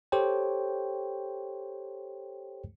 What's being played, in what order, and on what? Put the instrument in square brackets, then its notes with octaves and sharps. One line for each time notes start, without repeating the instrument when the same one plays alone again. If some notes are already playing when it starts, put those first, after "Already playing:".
[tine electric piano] G4 A4 C5 C#5 G5